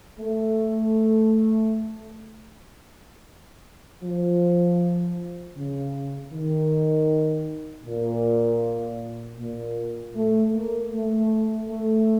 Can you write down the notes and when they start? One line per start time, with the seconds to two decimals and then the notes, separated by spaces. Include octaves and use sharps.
0.20 A3
4.03 F3
5.56 C#3
6.33 D#3
7.86 A#2
9.39 A#2
10.16 A3
10.54 A#3
10.92 A3
11.69 A3